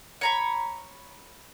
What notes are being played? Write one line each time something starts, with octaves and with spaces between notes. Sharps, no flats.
C#5 A#5 B5